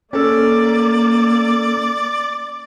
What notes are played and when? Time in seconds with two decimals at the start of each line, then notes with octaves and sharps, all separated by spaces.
0.13 A#3 C#4 A4 D5